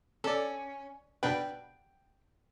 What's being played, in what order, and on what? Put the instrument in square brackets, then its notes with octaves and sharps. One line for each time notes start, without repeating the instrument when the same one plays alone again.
[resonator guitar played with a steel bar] C#4 [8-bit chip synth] A4 D5
[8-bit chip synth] B2 D4 B4 [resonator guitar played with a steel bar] G5